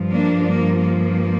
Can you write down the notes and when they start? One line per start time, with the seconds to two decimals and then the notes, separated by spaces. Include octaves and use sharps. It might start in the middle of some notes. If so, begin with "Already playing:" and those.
Already playing: G2 F3
0.11 A#3 D4
0.48 A#3
0.82 A#3